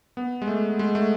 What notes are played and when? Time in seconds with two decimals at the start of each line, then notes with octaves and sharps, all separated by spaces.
0.17 B3
0.42 G#3
0.48 A3
0.79 G#3
0.95 A3